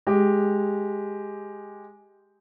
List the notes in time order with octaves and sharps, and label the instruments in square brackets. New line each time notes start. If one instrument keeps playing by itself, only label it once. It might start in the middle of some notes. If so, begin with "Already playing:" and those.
[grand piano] G#3 G4